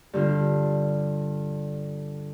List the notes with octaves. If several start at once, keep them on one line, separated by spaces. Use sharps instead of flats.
G2 D3 F4